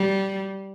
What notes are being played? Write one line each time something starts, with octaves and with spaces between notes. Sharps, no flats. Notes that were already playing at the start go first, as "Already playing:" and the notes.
Already playing: G3